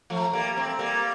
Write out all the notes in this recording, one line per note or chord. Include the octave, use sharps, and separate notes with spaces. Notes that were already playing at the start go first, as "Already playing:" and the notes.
F3 A3
G3 A#3
A3 C4
G3 A#3